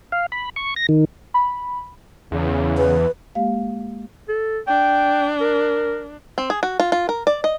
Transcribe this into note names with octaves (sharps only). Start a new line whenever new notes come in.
F5
B5
C#6
A#6
D#3
B5
E2 C#3
B4
G#3 A#3 G4 F5
A4
D4 G5
A#4
C4
G#4
F#4
F4
F4
A#4
D5
D#5